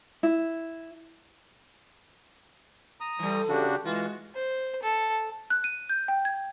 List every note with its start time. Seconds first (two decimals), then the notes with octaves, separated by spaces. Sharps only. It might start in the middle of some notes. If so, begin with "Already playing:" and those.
0.23 E4
3.01 A#5 D#6
3.19 E3 G3 A3
3.49 C#3 D4 F#4 G4
3.85 E3 G#3 F4 F#4
4.35 C5
4.83 A4
5.50 F#6
5.64 D#7
5.89 G6
6.08 G5
6.25 G#6